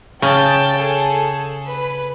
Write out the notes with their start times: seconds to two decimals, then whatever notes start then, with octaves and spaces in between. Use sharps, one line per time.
0.22 C#3 G5 A5 A6
0.76 G#4 A4
1.69 B4